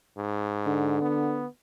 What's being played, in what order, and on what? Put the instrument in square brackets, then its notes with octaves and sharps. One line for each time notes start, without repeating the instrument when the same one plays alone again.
[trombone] G#2
[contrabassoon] D3
[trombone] B3